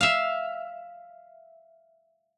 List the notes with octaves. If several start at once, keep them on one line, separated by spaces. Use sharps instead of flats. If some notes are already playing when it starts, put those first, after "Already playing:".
E5 F5